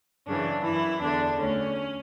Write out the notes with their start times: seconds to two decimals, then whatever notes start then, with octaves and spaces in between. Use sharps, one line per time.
0.27 F#2 C#3 E3 D4
0.63 F#2 E3 E4
1.01 E2 D3 D4
1.38 D2 D3 C#4